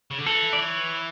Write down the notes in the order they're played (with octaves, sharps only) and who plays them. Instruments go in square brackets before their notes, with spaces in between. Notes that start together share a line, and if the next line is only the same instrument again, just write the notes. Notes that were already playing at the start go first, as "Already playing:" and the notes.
[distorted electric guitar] C#3
D3
[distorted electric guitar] E3 [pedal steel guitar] A4
[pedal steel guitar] D5
C#5